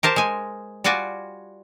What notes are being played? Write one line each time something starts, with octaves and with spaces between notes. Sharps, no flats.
G4 A#4 C5 A5
G#3 G#5
G3 F4 F#4 D5 G#5